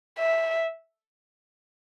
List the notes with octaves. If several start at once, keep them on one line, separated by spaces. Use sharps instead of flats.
E5